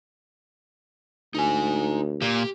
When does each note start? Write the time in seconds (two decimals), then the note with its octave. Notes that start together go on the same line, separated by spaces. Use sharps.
1.34 D2 D#4 G#5
2.22 A#2 G4